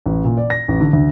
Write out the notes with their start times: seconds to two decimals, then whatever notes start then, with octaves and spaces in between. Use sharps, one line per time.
0.06 A1
0.24 A#2
0.37 D5
0.50 A#6
0.68 A1
0.81 D3
0.93 D2